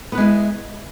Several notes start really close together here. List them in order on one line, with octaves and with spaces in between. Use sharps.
B3 B4 G#3 E4